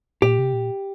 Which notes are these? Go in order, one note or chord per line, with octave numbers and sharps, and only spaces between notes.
A#2 G4
C3
A#2